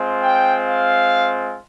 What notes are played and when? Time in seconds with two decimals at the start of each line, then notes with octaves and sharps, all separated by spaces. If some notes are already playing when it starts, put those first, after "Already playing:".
Already playing: G#3 C4 F4
0.22 G5
0.68 F5